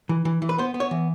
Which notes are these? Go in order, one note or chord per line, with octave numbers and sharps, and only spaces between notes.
E3
E3
E3
B4
B3 C5
B3
C#5
E3